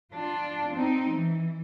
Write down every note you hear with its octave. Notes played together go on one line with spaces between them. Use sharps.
D4 F4
C4 D#4
E3